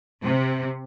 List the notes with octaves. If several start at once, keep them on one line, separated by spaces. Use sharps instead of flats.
C3